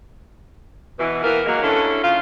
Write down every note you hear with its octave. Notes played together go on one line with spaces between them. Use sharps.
B2 E3
E3 A#3 B3 A#4
F#3 G#3 A#3
D3 A3 C#4 E4 A4
C#3 F4